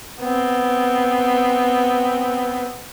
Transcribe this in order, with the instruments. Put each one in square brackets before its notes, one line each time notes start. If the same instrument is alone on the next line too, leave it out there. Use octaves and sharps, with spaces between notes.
[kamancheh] B3 C4